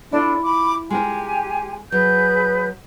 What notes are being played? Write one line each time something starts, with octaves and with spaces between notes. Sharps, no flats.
D4 E4 F4 A4
B5 D6
G#3 F4 G4 A#4 G#5
F#3 G#4 B4 G6